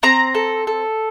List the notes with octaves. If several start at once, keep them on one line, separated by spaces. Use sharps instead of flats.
C4 A#5
A4
A4